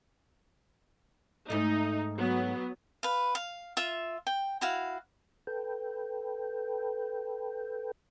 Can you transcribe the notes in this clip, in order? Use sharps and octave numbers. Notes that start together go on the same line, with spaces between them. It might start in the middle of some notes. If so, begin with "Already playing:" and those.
G#2 A3 D#4
F#3 B3
B4 F5
F5
F4 E5
G5
E4 F#4 F5
A4 B4 G5